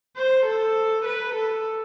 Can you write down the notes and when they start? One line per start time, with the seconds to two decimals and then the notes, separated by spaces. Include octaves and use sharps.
0.16 C5
0.46 A4
1.05 B4
1.35 A4